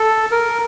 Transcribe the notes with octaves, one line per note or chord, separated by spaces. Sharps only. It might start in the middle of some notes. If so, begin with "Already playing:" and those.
Already playing: A4
A#4